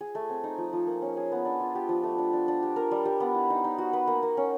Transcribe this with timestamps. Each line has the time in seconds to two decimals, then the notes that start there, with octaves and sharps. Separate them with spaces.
0.01 G#4
0.15 A3
0.29 C4
0.44 D#4
0.58 F3
0.73 F3
0.87 A#3
1.02 C#4
1.17 G#4
1.32 B3
1.45 D4
1.60 F4
1.75 G4
1.89 F3
2.03 A3
2.18 D4
2.33 D4
2.48 D4
2.63 G4
2.76 A#4
2.91 G3
3.05 G3
3.20 B3
3.35 E4
3.50 D#4
3.64 D#4
3.78 F#4
3.93 B4
4.07 A#3
4.23 A#3
4.37 C#4